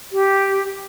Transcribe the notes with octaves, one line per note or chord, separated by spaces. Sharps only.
G4